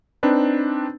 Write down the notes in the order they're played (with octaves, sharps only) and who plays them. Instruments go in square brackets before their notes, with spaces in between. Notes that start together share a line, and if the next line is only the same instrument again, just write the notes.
[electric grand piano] C4 D4 D#4 B4